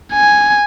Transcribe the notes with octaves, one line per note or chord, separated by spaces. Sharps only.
G#5